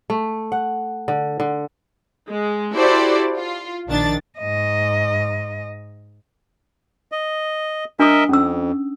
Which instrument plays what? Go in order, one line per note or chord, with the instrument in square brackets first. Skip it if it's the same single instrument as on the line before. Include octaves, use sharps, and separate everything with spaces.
[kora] A3
F#5
D3
D3
[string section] G#3
E4 F#4 G4 A4 C5 D5
F4
A#1 D#3 D4 A6
[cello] G#2 D#5
[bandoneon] D#5
[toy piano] D4 D#6 [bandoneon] A#4 D#5 E5
[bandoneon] F2 [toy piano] C#4 E6